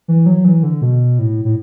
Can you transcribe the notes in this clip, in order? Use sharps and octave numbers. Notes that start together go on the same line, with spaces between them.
E3
F#3
E3
D3
B2
A2
A2